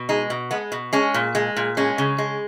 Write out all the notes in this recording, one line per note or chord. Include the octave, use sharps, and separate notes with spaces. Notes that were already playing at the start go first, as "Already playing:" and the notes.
Already playing: B2
G#3 D#4
B2
G#3 B3
B2
G#3 C#4
A#2
G#3
A#2
G#3 C#4
C#3
G#3